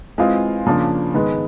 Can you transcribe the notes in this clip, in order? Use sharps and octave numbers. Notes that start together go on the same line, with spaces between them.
E3 G#3 C4 F4 G#4
C#3 F3 A#3 D4 F4
G#2 D#3 G#3 B3